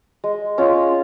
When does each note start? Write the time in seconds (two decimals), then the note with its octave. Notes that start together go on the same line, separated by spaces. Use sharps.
0.24 G#3
0.58 C#4 F4 G#4